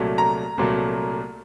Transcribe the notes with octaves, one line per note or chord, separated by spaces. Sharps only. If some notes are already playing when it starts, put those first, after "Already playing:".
Already playing: C2 A#2 F#3 A3
A#5
C2 A#2 F#3 A3